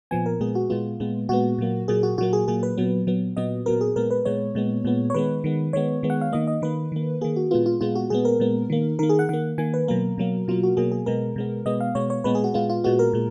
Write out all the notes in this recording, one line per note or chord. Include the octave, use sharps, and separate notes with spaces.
A#2 F3 B3 G#5
A#4
A#2 G#3 B3 G#4
F#4
A#2 G#3 B3 F4
A#2 G#3 B3
A#2 G#3 B3 F#4
A#2 F#3 A#3
A#2 F#3 A#3 G#4
F#4
A#2 F#3 A#3 F#4
G#4
A#2 F#3 A#3 G#4
B4
A#2 F#3 B3
A#2 F#3 B3
A#2 F#3 B3 D#5
A#2 F#3 B3 A#4
G#4
A#2 G#3 B3 A#4
B4
A#2 G#3 B3 C#5
A#2 G#3 B3
A#2 G#3 B3
C#5
D#3 G#3 B3 B4
D#3 G#3 B3
D#3 G#3 B3 C#5
D#3 G#3 B3
F#5
F5
D#3 A#3 D#5
D#5
D#3 A#3 B4
D#3 A#3
D#3 A#3 G#4
F#4
A#2 G#3 B3 F4
F4
A#2 G#3 B3 F4
F#4
A#2 G#3 B3 G#4
A#4
A#2 G#3 B3
D#3 A#3
D#3 A#3 A#4
G#4
F#5
D#3 A#3 F#5
D#3 A#3 G#5
B4
B2 F#3 A#3 A#4
B2 F#3 A#3
B2 F#3 A#3 F4
F#4
B2 F#3 A#3 G#4
G#4
B2 G#3 B3 A#4
B2 G#3 B3
B2 G#3 B3 D#5
F5
B2 G#3 B3 C#5
C#5
A#2 G#3 B3 B4
G#4
F#4
A#2 G#3 B3 F4
F4
A#2 G#3 B3 F#4
A#4
A#2 G#3